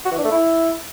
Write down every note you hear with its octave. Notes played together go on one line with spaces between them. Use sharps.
F#4
E3
D4
A3
E4